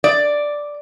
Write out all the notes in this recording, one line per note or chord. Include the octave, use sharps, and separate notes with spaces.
D5